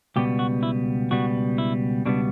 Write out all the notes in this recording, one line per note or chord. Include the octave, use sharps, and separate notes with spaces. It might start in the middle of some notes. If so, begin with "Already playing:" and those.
C#2 B2 G3 B3 G4
F#4
E4
C#2 B2 G3 B3 F#4
E4
C#2 B2 G3 B3 D4